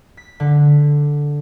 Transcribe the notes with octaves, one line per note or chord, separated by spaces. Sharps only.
B6
D3